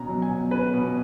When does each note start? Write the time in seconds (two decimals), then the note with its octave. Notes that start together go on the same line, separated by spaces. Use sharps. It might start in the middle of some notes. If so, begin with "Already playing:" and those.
Already playing: B2 C#4 A#5
0.08 F#3
0.22 G#5
0.30 B2
0.51 C#4 B4
0.74 B2